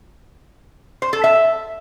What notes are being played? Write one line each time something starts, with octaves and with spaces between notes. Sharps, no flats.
C5
A4
E5